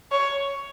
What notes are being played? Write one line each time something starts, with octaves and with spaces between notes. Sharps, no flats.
C#5